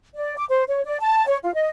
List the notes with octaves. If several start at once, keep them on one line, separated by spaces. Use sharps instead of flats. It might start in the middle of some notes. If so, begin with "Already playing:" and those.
D5
D6
C5
C#5
D5
A5
C#5
F4
D#5